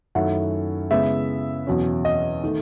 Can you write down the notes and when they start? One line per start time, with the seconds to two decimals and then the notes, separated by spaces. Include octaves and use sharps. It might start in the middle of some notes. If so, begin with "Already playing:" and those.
0.15 F#2 D#3 A3 C#4 E4 F#5
0.91 C#3 G#3 B3 E4 E5
1.67 E2 B2 F#3 C#4
2.05 D#5
2.44 D#3 A3